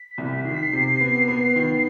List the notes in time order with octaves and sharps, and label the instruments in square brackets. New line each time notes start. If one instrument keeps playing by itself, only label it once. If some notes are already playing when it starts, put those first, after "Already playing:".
Already playing: [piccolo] B6
[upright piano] C2
[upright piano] D#3 [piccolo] C7
[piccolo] B6
C7
[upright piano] C3
B3
B3
D#3